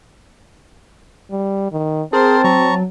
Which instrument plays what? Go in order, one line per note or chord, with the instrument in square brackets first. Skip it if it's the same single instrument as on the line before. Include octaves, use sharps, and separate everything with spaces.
[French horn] G3
D#3
[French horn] C4 [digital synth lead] G#4 [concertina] A#4 C5 [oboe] A5
[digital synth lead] F#3 [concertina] A#5 C#6